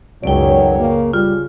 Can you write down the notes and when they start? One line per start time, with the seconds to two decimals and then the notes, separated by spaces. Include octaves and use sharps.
0.24 C#2 F#2 B2 D#3 F#3 C#5 D5 G5
0.79 C#3 A#3
1.13 G3 F4